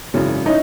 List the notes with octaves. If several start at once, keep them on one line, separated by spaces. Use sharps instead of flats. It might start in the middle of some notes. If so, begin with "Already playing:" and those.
G#1 F#2 C#3 E3
C#4 D#4 E4